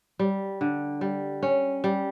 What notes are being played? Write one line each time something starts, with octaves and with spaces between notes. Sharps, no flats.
G3
D3
G3
C#4
G3